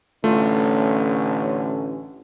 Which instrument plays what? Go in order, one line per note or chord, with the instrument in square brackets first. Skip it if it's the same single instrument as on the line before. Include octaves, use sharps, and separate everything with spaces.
[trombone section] A1 D3 C#4 [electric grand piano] A3 F4